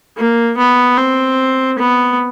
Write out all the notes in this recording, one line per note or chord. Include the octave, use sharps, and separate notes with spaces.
A#3
B3
C4
B3